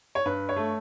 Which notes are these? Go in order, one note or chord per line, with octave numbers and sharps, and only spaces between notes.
C#5
G2 B4
C#5
A3